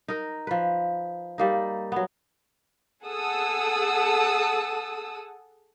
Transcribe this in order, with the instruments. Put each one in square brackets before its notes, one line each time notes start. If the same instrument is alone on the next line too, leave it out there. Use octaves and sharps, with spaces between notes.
[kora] D#4 A#4
F3 B4
G3 A#3 D#4
F#3 B3
[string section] G#4 A4 F#5 A5 D#6 E6